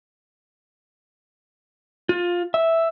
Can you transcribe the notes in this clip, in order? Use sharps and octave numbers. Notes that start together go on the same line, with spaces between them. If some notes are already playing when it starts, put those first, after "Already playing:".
F4
E5